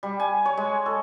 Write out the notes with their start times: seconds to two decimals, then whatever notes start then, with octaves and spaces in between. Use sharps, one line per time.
0.03 G3
0.20 G#5
0.45 C#5
0.57 G#3
0.86 A4